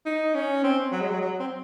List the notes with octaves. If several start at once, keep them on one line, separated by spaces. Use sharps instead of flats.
D#4
C#4
C4
F#3
G#3
F#3
F#3
C4